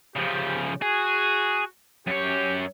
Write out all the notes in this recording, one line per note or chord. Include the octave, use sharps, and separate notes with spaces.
C#3 F3 G4
F#4 G#4
F#2 G4 C#5